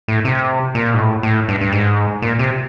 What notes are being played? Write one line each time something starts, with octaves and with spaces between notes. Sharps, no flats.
A2
C3
A#2
G#2
A2
A2
G2
G2
G#2
A#2
C3